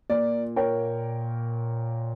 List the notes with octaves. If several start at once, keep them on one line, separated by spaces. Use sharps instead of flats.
A#2 D5
A#4 C#5 G5